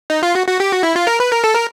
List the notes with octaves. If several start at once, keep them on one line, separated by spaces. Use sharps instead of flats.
D#4
F4
F#4
F#4
G4
F#4
E4
F4
A#4
B4
A#4
A4
A#4